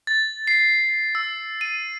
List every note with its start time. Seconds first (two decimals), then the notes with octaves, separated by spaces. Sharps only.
0.07 A6
0.47 C7
1.15 E6
1.61 D#7